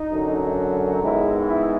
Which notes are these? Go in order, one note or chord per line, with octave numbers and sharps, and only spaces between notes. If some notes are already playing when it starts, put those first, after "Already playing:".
Already playing: D#4
F#2 D3 F#3
G#2 D#3 G#3 B3 E4
E4